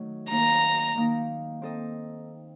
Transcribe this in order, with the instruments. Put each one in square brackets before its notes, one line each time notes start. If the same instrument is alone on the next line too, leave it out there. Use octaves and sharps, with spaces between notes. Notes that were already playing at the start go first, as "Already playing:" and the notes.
Already playing: [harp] D#3 F#3 A3 D#4
[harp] D#3 A#3 D#4 [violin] A#5
[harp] D#3 A#3 D#4
C4 D#4 A4 D#5